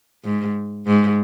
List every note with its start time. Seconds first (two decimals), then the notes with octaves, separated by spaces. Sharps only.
0.24 G#2
0.87 G#2